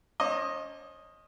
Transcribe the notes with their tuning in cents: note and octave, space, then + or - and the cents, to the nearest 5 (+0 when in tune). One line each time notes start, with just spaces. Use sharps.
C#4 +35 C5 +45 D#5 +0